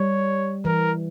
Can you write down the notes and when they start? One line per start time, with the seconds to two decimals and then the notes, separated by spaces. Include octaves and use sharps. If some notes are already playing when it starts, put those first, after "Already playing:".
Already playing: G3 C#5
0.65 E3 A#4